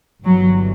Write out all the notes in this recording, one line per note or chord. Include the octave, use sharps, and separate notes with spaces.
G1 G2 E3 F#3